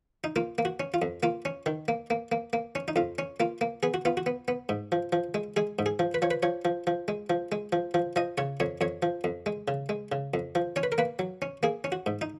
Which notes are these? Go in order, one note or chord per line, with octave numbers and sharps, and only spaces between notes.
D#4
A#3 F4
A#3
F#4
C#4
F4
F2
A#3 F4
C#4
D#3
A#3
A#3
A#3
A#3
C#4
D#4
F2 F4
C#4
A#3 F4
A#3
B3 G#4
F#4
B3 F4
F#4
B3
B3
G#2
F3
F3
G#3
G#3 G#4
G#2
G#4
F3
B4
F3 C#5
B4
F3 C#5
F3
F3
G#3
F3
G#3
F3
F3
F3 D#5
C#3 C#5
F2 C#5
F2 C#5
F3
F2
G#3
C#3
G#3
C#3
F2
F3
C#4 C#5
B4
A#4
A#3 B4
F#3
C#4
A#3 G#4
C#4
F#4
G#2
D#4